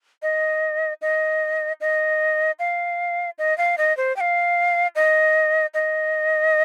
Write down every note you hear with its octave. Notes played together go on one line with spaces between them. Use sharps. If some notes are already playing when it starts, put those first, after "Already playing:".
D#5
D#5
D#5
F5
D#5
F5
D#5
C5
G5
F5
D#5
D#5